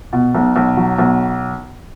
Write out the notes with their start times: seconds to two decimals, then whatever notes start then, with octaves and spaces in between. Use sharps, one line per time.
0.13 B2
0.35 B1
0.56 B1
0.77 F#3
0.98 B1